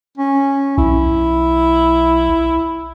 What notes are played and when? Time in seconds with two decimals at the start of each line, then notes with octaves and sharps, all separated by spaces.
0.17 C#4
0.78 B1 E4